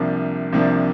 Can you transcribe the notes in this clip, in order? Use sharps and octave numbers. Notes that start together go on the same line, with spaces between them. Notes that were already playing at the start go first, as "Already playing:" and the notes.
Already playing: C2 C3 F3 A#3 D4
C2 C3 F3 A#3 D4